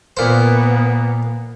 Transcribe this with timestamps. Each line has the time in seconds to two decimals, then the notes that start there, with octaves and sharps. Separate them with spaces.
0.17 A#2 A#3 B3 C5